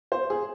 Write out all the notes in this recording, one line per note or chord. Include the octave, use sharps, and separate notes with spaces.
C5
G#4